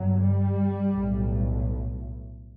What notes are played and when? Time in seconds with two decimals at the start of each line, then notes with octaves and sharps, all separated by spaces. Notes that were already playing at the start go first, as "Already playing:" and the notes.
Already playing: G1 G2 F#3
0.22 G3
0.92 B1 A2